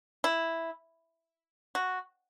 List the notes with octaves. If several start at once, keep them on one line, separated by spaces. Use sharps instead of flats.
E4
F#4